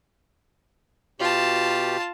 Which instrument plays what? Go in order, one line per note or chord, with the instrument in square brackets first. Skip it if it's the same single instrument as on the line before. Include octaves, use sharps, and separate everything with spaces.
[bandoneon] B2 G4 [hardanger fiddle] F4 A5